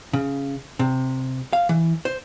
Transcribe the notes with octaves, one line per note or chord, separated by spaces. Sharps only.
C#3
C3
F5
E3
C5